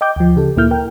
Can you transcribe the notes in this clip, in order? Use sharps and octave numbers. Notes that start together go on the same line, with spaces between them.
D#5 G5 D6 G6
D2 F3
C#3 G4 A4
D2 A#2 A#3 E4 F6 G6
A#4 G5